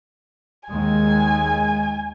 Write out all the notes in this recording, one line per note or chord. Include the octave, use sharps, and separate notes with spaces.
D#2 D#3 G#3 G#5